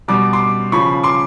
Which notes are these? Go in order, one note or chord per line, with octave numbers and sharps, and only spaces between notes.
B2 G3 D6
C6 D6
C#3 F3 B5 C#6
C6 D6